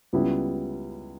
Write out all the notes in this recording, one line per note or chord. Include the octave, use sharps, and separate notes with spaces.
C#2 C#3 G3 B3 E4